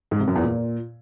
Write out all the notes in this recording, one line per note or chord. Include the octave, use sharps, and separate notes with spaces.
G#2
C3
F#2
E2
A#2